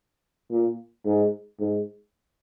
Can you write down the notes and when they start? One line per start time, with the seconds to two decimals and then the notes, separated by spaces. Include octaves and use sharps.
0.51 A#2
1.06 G#2
1.60 G#2